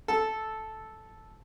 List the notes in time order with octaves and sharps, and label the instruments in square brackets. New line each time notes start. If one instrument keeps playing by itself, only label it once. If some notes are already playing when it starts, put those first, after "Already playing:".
[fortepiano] A4